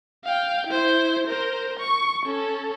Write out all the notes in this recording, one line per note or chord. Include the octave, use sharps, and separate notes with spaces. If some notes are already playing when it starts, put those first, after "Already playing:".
F5 G5
E4 C5
A#4 C5
C#6
C#4 A4